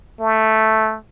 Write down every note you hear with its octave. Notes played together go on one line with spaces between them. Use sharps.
A3